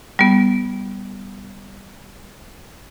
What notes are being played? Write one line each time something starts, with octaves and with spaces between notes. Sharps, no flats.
G3 B3